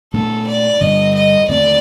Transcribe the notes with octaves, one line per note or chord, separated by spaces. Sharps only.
A#2 A3 D4 A4
D5
G2 D3 G3 D4 D#5
D#5
D#2 D3 A3 C4 D5